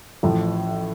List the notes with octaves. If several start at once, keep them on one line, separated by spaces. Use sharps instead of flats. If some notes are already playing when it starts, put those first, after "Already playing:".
A1 A2 F3